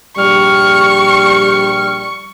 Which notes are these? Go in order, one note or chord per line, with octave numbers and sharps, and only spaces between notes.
A#1 G3 C#6 F6